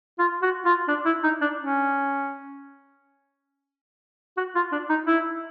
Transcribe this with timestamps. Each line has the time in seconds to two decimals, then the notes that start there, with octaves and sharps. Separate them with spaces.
0.19 F4
0.42 F#4
0.65 F4
0.88 D4
1.05 E4
1.23 D#4
1.41 D4
1.59 C#4
4.37 F#4
4.55 F4
4.72 D4
4.89 D#4
5.07 E4